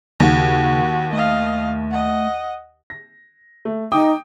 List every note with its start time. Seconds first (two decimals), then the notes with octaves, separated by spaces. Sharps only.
0.20 D#2 C#3 F#4
1.13 A3 D#5 F5
1.90 D#5 F#5
2.90 A#6
3.65 A3
3.92 D#4 G5 D6 D#6